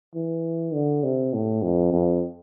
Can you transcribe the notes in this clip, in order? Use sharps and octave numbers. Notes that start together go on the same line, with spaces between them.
E3
D3
C3
A2
F2
F2